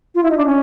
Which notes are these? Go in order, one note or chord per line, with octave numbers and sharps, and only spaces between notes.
F4
E4
D#4
D4
C#4